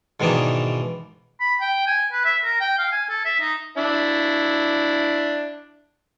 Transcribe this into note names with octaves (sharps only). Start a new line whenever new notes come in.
G#2 B2 D#3 E3 D4 D#4
B5
G5
G#5
B4
E5
A#4
G5
F5
G#5
A4
E5
D#4
D4 E4